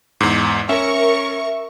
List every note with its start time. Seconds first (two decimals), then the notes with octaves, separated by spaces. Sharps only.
0.21 E2 G#2
0.69 C#4 A#4 E5 C#6